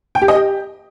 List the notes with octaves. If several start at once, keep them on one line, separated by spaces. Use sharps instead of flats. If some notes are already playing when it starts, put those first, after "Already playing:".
G5
G4
D#5
G4